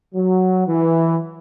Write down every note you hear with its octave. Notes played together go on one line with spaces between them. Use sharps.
F#3
E3